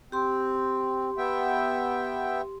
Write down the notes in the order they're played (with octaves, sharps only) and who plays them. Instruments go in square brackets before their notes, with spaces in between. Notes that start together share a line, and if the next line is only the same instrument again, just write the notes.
[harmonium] C4 [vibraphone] G4 C6
[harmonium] B3 E5 G5